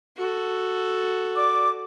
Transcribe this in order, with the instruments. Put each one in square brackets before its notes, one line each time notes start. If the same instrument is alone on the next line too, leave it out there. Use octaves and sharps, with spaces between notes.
[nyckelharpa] F#4 A4
[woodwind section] D5 D6